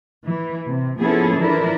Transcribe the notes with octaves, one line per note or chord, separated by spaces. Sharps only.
E3
C3
F3 B3 C#4 E4 G#4 A4
E3 F3 D4 E4 A#4 B4